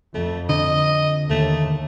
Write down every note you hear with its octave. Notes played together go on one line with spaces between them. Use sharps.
F2 A3
D3 D#5
D#2 A3